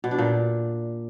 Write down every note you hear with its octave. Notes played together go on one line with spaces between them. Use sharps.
B2
D4
A#2